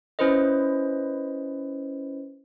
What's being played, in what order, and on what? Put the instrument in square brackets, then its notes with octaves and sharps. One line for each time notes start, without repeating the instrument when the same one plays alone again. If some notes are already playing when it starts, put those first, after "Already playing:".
[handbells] C#4 E4 B4 C5 D#5